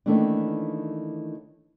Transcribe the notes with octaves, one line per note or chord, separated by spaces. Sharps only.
D#3 E3 A3 A#3 C#4 D4